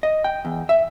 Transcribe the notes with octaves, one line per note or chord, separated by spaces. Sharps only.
D#5
G5
E2
E5